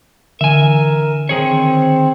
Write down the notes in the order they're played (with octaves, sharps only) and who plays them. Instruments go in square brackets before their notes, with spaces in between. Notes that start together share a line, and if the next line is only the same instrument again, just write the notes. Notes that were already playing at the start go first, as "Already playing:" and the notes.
[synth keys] D3 E3 E7 [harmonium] A#4 [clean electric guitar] E5 G#5
[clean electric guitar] D#3 G#4 C#5 [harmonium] C4